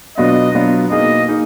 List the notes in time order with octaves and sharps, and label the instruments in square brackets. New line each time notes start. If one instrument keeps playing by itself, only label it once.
[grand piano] B2 F#3 B3 D4 F4 [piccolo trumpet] D#5
[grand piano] B2 F#3 B3 D4 F4
[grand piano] B2 A#3 D#4 G#4 [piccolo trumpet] D#5
[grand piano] A#3 D#4 G#4